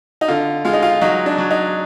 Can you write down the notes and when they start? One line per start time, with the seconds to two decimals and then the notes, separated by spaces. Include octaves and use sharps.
0.21 D#4
0.28 D3 F4
0.65 G#3 F4
0.73 D#4
0.82 F4
1.01 F#3 D#4
1.26 D4
1.38 F#3
1.50 D#4